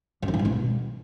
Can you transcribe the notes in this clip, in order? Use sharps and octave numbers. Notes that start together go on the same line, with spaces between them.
F#2
D#3
B2
G#2
B2